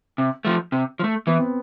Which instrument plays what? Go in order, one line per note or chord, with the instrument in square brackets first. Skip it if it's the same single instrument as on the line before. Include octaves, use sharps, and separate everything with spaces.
[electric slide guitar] C3
F3 A3
C3
F3
A3
[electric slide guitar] E3 [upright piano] B3
[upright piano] C4